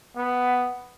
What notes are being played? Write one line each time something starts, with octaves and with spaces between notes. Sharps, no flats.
B3